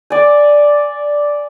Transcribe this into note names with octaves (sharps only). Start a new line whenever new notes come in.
D5 G#5